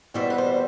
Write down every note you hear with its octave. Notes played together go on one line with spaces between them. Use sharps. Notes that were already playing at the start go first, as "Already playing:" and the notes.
E2 B2 G3 C4 E5
B4
C5